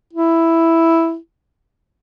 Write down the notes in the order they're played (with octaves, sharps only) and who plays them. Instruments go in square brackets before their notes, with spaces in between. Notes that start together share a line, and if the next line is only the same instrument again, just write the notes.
[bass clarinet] E4